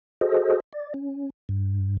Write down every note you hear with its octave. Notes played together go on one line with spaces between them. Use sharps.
F#4 G#4 A4 C5 D#5
D5
C#4
G2